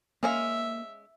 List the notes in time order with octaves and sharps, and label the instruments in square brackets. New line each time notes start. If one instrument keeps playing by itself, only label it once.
[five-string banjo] G#3 C#4 F5 [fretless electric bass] A#3 [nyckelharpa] E5